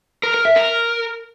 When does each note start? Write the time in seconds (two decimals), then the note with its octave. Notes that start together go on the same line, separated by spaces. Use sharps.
0.23 A#4
0.34 A#4
0.45 E5
0.56 A#4